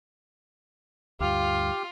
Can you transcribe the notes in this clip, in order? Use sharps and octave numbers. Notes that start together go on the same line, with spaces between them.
D2 G2 F4 G4 F5